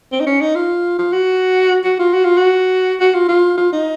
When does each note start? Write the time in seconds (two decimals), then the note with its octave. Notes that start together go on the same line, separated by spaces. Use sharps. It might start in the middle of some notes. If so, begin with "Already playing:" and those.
0.12 C4
0.20 D#4
0.27 C#4
0.41 D#4
0.55 F4
0.99 F4
1.13 F#4
1.85 F#4
1.99 F4
2.13 F#4
2.25 F4
2.37 F#4
3.00 F#4
3.14 F4
3.28 F4
3.57 F4
3.72 D#4